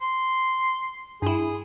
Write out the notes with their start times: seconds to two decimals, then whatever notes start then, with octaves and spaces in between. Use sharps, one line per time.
0.01 C6
1.22 G2 E4 G#4